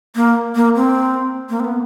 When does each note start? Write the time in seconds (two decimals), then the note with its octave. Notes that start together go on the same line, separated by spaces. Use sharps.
0.16 A#3
0.56 A#3
0.76 C4
1.50 A#3
1.60 C4
1.64 B3